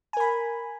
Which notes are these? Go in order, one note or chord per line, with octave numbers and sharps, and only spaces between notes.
A#4 G#5 B5